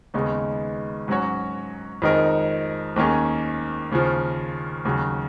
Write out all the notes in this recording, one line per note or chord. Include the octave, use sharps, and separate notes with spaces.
D#2 C#3 G#3 B3 D#4
G#2 F#3 C#4 F#4 C#5
F2 D#3 G#3 D#4 A#4
D#2 D#3 A#3 C#4 G#4
D#2 C#3 F3
D#2 C#3 F#3